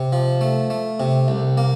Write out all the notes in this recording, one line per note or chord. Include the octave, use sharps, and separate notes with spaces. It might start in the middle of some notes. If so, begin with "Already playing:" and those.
Already playing: C3
F3
A3
A3
C3
C2
A#3